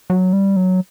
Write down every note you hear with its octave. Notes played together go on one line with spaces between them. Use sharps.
F#3
G3
F#3